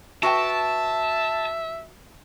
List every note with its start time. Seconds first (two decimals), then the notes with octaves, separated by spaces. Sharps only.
0.23 F#4 B4 E5 G5 A5